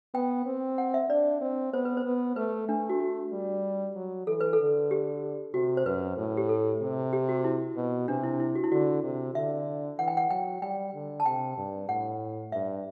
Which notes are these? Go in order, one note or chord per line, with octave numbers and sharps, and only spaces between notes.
B3 G5
C4
F#5
E5
D4 D5
C4
B3 C5
B4
C5
B3
A3 B4
A3 D4
F#4
F#4
G3
F#3
E3 A4
B4
A4
D3
G4
C3 F#4
C5
F#2 B4
A2
G4
A4
C3
G4
F#4
E4
B2
C3 D4
E4
E4
F#4
E4
D3 F#4
C3
D3 E5
E3 F#5
G5
F#5
F#3 G5
G3 G5
D3
A5
C3 G5
G2
A2 F#5
G2 E5